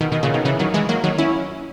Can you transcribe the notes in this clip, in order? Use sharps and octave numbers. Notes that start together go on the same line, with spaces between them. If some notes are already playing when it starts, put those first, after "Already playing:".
B2 D#3
B2 D#3
A#2 C#3
B2 D#3
C#3 E3
D#3 F#3
E3 G#3
F#3 A#3
D#3 F#3
C#4 E4